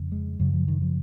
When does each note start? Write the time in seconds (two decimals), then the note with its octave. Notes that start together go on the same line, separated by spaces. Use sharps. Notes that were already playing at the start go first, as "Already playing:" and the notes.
Already playing: F2 C#3
0.12 G#3
0.40 F#2 C#3 F#3
0.53 F3
0.68 D#3
0.82 F3